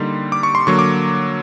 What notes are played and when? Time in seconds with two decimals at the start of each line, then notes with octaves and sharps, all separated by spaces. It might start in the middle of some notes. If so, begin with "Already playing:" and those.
Already playing: D3 G3 A#3 D#4 C6
0.32 D6
0.43 C#6
0.55 C6
0.67 D3 F#3 A#3 C#6
0.79 D6